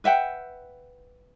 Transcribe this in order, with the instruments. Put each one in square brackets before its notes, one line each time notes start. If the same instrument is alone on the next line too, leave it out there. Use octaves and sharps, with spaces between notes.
[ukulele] B4 E5 F#5 G5